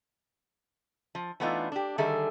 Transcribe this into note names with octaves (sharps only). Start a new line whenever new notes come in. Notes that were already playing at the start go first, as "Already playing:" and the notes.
F3
E3 A3 B3 D4 D#4 F4
D4 G4
D3 D#3 G3 G#4 A4 E5